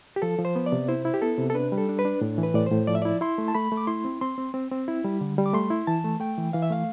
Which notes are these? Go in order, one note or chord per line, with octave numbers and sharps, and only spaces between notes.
G4
F3 A4
F3
C5
B3
D5
C3
E4 C5
E4
G4
B3 A4
C3
A4
D4 B4
G3
A4
D4
B4
D4
A2
E3
B4
A2 D5
A2 C5
F3 D5
E5
E4 D5
E4 C6
A3
A5
A3 B5
A3
D6
E4 C6
C4
C4 C6
C4
C4
C4
E4
G3
D3
G3
D6
A3 C6
E4
E3 A5
A3
A3 G5
E3
E3 F5
E5
A3 F5